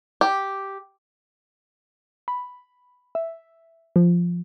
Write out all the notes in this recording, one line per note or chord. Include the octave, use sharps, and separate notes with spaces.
G4
B5
E5
F3